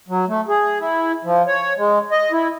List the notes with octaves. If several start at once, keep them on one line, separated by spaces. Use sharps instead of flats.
F#3
A3
G#4
E4
F3
C#5
G#3
D#5
E4